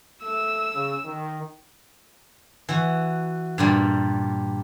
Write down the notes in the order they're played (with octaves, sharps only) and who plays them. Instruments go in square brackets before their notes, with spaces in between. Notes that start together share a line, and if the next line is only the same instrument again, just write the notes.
[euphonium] A3 [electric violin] E6
[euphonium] C#3
D#3
[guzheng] E3 F#4
G2 A#2 G3